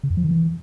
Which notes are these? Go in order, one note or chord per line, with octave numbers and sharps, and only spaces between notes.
C#3
F2
F3
D#3
E3